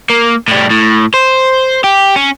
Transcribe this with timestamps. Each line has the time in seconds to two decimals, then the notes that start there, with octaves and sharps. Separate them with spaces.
0.10 A#3
0.48 A2 G3
0.71 A2
1.14 C5
1.84 G4
2.16 C#4